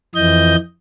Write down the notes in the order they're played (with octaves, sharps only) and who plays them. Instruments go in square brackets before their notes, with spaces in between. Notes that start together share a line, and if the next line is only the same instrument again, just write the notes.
[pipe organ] F2 E3 D#5 G6